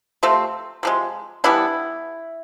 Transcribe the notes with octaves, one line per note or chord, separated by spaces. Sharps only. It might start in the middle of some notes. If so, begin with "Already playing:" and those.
C3 F3 A3 C4
C3 F3 G#3
E3 G3 B3 D4 E4